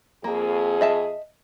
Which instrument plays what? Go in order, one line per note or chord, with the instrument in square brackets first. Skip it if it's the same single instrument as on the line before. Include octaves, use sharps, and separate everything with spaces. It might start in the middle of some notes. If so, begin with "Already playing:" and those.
[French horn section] F2 G#4 [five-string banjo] A#3
[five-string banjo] D#5 E5 A5